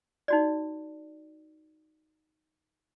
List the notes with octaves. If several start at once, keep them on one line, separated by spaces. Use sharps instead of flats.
D#4 F#4 D5